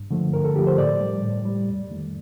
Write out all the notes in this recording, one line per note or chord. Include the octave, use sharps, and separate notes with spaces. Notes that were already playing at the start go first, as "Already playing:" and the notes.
Already playing: G2
D3 F3 A3
G2 A#4
A4
D3 F3 A3 G4
C5
A2 D5
G3
A2
G3
F2
D#3 A3